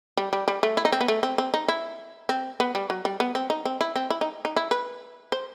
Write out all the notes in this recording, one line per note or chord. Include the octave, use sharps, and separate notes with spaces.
G3
G3
G3
A3
E4
D#4
C4
B3
A3
C4
C4
D#4
E4
C4
B3
G3
F#3
G3
B3
C4
D#4
C4
E4
C4
E4
D#4
D#4
E4
B4
C5